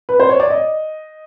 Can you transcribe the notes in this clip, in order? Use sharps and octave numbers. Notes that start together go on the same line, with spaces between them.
B4
C5
C#5
D5
D#5